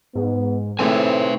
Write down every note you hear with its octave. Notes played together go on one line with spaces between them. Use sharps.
G#2 B3
A2 A3 C4 D#4 G#4 A4 B4 G#5